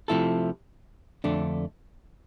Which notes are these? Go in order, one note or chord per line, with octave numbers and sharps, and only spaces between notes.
C3 F3 A3 E4 A4
F2 D3 A3 D4